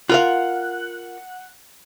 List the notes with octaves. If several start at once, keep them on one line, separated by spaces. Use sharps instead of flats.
F4 A#4 F5 F#5